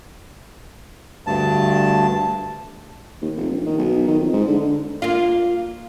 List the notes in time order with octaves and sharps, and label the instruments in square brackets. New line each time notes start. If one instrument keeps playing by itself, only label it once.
[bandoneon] D2 G2 A5
[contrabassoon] D#2
F1
A#1
D#3
B1
D#3
F2
G#2
D3
D3
[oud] A#3 F4